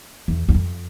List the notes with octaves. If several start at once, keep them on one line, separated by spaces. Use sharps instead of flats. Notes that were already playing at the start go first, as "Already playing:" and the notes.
E2
E2
F2